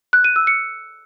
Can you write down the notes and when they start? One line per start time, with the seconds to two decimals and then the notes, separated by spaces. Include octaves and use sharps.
0.13 F#6
0.24 D#7
0.36 E6
0.47 C#7